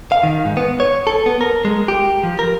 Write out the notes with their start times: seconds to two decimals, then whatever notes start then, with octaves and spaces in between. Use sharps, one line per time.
0.12 F5
0.23 D#3
0.45 G#2
0.57 B3
0.80 C#5
1.07 A4
1.26 B3
1.41 A#4
1.65 G#3
1.88 G4
2.24 F3
2.39 A#4